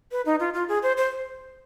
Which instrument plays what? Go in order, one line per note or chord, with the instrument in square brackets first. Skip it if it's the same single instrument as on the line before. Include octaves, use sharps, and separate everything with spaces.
[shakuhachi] B4
D#4
F4
F4
G#4
C5
C5